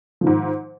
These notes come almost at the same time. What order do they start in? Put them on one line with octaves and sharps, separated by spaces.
F3 D#3 G#2